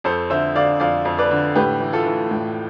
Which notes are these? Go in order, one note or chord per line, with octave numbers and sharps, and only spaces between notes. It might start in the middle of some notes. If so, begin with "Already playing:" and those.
F2 A4 C5
D3 C5 E5
D3 D5 F5
F2 D5 F5
F2
B4 D5
D3
A2 G4 B4
E3
F4 A4
E3
A2